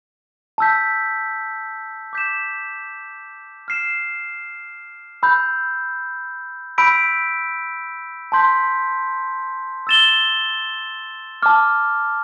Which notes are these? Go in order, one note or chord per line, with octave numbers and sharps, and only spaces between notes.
A5 E6 G6 B6
D6 G6 B6 E7
F6 C7 E7
B5 E6 G6
B5 E6 G6 B6 D7
A5 C6 G6 B6
E6 A6 E7 G7
A5 D6 F6